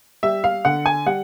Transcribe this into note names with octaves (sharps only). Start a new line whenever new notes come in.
G3 E5
F5
D3 F#5
G#5
G3 F#5